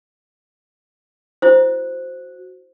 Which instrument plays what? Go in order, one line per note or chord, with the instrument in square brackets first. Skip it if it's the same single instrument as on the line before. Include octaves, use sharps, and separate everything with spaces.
[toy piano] E4 C5 [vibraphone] F#4